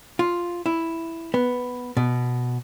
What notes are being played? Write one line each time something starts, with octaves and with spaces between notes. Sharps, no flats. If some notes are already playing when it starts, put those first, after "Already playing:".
F4
E4
B3
B2